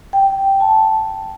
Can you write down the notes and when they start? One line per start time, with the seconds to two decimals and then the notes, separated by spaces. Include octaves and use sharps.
0.13 G5
0.60 A5